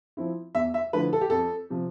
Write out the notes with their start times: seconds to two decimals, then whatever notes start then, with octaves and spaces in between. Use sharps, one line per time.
0.17 F3 C4 E4
0.55 E2 E5
0.74 E5
0.93 D3 F3 A3 E4 B4
1.13 A4
1.21 G4
1.30 F2 A4
1.70 C3 F3